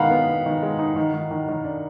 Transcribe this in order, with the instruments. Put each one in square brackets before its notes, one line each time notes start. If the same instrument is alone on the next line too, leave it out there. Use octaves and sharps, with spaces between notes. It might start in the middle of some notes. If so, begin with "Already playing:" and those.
Already playing: [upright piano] D#3 G#3 B3 [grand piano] F5 F#5 A#5 B5
[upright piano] B3
B3
D#3
G#3
D#4
D#3
D#3
D#3
D#3
D4